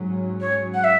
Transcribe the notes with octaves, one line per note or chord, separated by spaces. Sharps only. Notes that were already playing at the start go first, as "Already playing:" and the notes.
Already playing: G#2 F#3 C#4
C#5
F#5
E5